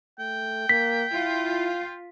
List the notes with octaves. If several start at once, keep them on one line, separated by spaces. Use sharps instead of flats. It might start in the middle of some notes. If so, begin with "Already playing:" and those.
A3 G5
A#3 B6
E4 F4